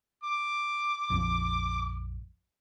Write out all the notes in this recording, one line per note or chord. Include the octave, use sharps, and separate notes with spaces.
D6
A#1 F2 F3